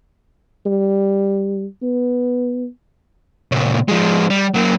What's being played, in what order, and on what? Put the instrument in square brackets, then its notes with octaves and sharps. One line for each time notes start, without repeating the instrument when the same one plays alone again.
[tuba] G3
B3
[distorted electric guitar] A#2 C#3
F3 G#3
G3
F#3 A#3